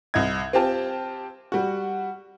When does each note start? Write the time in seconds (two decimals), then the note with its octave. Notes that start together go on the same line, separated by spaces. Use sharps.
0.14 C2 D#5 G#6
0.53 C4 F4 G4 A5
1.52 G3 F#4